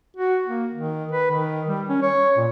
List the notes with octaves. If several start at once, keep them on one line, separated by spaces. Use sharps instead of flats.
F#4
A#3
D#3
B4
D#3
G3
C#4
C#5
A#2